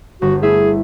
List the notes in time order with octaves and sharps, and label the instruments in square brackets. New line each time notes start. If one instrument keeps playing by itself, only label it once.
[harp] G1 [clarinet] F#4
[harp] A3 E4 E5 [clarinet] G#4